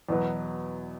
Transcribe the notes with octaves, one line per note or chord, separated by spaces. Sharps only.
E2 B2 F#3 B3